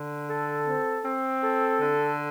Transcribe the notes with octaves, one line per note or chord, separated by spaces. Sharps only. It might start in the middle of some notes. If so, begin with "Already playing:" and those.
Already playing: D3
A4
C4
C4
A4
D3